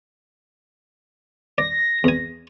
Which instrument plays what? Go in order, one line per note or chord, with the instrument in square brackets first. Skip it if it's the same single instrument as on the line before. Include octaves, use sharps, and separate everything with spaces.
[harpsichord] D5 [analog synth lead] A#6
[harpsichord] E2 G#5